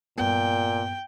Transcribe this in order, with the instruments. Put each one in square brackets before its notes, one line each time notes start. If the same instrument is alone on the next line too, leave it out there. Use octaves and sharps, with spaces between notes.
[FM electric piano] G2 B3 [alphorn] A#2 [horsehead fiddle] G5